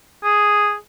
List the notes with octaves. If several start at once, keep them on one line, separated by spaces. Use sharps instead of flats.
G#4